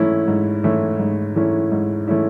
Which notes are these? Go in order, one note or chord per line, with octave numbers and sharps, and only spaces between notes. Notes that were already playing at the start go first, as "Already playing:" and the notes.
Already playing: G#2 E3 A3 C#4 E4
G#2
E3 A3 C#4 E4
G#2
E3 A3 C#4 E4
G#2
E3 A3 C#4 E4